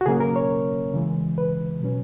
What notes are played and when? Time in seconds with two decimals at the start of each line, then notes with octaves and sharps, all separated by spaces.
0.01 F#4
0.06 C#3 F#3 A#3 C#4 G#4
0.20 A#4
0.36 C#5
0.94 C#3 E3 G#3
1.38 B4
1.81 B2 F#3 C#4